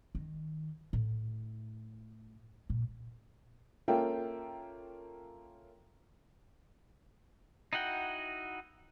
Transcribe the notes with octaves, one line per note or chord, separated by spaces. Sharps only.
D#3
A2
A#2
A#3 C#4 F4 A4 E5 G5
D#4 E4 F#4 F#5 G5